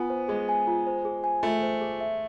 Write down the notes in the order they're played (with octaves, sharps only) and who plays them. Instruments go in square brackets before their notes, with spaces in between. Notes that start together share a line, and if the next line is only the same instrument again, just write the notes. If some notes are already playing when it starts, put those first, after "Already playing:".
Already playing: [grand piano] B3 [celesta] F4 G#5
[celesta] C5
[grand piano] G#3 [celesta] G#4
[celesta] G#5
F4
C5
G#4
G#5
[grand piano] A3 [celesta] F4
[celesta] C5
G#4
E5